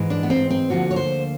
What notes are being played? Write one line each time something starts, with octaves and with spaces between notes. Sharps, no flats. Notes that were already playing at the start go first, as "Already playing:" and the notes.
Already playing: G#2 E3 G#3
D4
B3
C4
C4
D2 D3 F3 A#3 F#4
C#5
C5